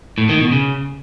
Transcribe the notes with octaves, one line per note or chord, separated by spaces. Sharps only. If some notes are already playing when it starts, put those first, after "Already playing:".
A2
D#3
B2
C#3